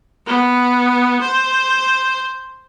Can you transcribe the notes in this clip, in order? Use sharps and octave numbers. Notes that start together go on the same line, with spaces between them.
B3
C5